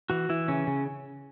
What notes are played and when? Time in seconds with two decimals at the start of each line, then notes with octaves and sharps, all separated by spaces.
0.10 E3 F#4
0.29 E3 E4
0.48 C#3 C#4
0.67 C#3